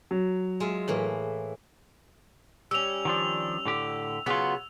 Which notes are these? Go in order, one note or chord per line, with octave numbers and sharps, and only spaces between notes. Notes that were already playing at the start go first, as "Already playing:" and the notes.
F#3
G#3 F4 E5
A2 E3 A#3
G3 C#4 E6 F7
D#3 F3 D4
A2 D3 G4
C#3 F#3 B3 F4 F#4